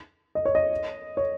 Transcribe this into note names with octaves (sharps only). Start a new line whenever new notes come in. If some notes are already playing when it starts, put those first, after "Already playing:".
D#5
C#5
D#5
C#5